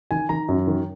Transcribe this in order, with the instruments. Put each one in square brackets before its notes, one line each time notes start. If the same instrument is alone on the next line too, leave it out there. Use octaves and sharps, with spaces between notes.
[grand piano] D#3 G#5
D#3 A#5
F#2
D#3